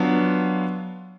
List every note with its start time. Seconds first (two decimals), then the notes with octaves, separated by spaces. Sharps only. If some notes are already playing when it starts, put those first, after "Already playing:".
Already playing: F#3 B3 D4 F4